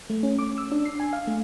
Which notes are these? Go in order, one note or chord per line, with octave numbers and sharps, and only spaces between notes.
A3
C#4
D6
E6
D4
C7
G#5
F5
A3